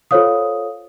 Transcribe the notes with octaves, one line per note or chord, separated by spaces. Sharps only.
F4 A4 C5 C#5 F5 D#6